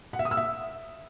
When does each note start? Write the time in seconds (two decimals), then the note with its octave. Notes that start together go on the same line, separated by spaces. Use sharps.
0.13 F#5
0.19 E5
0.25 D#6
0.31 E6
0.37 E5